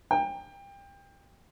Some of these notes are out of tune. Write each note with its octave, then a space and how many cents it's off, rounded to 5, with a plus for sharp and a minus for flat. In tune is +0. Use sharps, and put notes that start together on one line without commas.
G5 +25